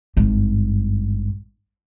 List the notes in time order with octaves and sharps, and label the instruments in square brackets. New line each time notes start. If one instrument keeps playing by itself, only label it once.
[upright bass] G#1 G2